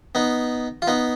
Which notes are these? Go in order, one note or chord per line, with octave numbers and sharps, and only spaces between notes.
B3 D#4
F4
B3 D#4